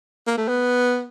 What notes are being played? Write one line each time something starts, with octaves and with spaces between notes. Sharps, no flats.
A#3
A3
B3